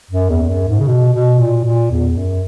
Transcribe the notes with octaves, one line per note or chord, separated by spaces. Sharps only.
F#2
E2
E2
F#2
G#2
C#3
B2
B2
A#2
A#2
E2
F#2